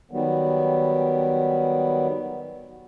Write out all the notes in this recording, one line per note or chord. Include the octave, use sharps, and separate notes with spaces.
D#3 F#3 G3 B3